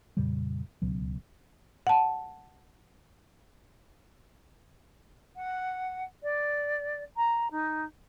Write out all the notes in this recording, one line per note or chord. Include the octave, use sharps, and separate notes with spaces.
F2 A#2 C#3 G3
D1 C#2 B2 F#3
F#5 A5
F#5
D5
A#5
D#4